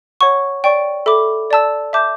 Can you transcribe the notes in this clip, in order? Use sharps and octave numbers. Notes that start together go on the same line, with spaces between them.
C#5 F#5 C#6
D5 G5 C#6
A4 E5 B5 D6
D5 A5 E6
E5 A5 D6 G6